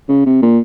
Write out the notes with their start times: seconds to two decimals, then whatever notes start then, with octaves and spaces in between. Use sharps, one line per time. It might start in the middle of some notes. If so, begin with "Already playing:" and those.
0.09 C#3
0.26 C3
0.42 A#2